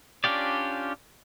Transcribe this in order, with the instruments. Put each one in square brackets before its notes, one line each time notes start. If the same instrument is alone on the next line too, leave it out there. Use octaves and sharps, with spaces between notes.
[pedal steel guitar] C#4 D4 F4 G4 D5